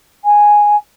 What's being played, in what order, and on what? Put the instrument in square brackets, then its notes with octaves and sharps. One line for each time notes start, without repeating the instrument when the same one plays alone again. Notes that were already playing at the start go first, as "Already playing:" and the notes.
[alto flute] G#5